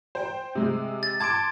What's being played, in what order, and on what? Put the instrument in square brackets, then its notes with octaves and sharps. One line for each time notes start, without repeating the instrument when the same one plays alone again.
[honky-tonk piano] C5 G5
C3 G#3
[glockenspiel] A6
[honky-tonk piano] A5 C6 D6 [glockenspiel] G#6 D7